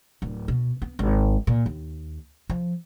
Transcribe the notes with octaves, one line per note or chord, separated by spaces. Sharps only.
D1
B2
B3
G#1
A#2
D#2
F3